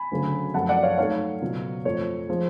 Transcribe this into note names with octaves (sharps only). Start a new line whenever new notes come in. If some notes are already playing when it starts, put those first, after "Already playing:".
Already playing: G#5 B5
D2 C#3 F#3 A3
F#2 F3 A3 F#5 A5
D5 F#5
C#5 F5
G#2 F#3 A3 C#5 F5
C#2 B2 F#3
F2 F3 A3 C#5
F3 G#3